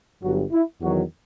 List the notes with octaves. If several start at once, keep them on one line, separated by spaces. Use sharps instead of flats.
G1 G2 F#3 F#4
E4
E2 D#3 F#3 F#4